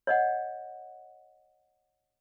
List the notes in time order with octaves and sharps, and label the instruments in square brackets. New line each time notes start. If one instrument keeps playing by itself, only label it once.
[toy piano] C#5 D#5 F#5